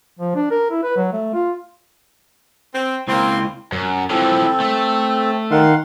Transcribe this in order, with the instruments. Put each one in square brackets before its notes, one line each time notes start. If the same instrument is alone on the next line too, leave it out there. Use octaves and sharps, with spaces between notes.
[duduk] F3
D4
A#4
E4
B4
F#3
A3
F4
[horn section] C4
[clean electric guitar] C#2 E4 C6 [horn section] A#3 C4
[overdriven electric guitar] F#2
[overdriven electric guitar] E3 F3 [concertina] C4 A4
[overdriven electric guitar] A3
[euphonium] D#3 [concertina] F5 F#5 C6